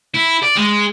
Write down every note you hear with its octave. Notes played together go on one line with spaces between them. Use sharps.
E4
D5
G#3